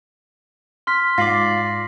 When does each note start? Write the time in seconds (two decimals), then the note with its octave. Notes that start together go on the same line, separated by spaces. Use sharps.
0.87 C6 F6 B6
1.18 G#2 F4 D5 A#6 C7 F#7